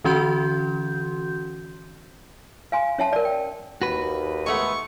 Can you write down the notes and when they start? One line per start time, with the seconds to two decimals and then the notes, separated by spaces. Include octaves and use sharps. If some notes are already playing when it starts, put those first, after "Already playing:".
0.04 D3 E3 C#4 F#4 C6 G6
2.72 F5 G#5 C6
2.98 C#4 C#5 E5 F#5 A5
3.13 A#4 D5
3.25 G5
3.82 D#2 F#4 B4
4.46 G#3 A3 B3 C#6